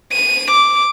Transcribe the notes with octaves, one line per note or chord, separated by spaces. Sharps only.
D#7
D6